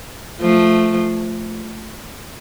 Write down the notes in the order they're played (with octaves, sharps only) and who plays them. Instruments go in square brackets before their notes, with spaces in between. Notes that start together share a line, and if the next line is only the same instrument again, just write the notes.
[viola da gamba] F3 A3